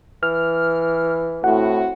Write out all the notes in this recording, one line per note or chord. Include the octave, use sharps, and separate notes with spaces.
E3 F6
A2 C4 E4 F#4 F#5